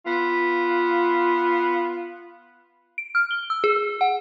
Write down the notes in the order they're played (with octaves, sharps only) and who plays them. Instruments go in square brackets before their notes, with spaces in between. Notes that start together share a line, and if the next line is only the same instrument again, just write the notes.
[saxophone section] B3 F4
[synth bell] D7
F6
G7
E6
G#4
F#5